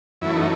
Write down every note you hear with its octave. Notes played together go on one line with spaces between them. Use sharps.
F#2 E3 A3 E4
D#4